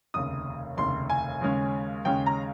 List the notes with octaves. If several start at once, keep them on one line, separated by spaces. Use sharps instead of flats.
F1 D#2 C#3 D#6
F1 D#2 C#3 C6
G#5
D#2 C#3 G#3 C#4
D#2 C#3 G#3 C#4 G5
A#5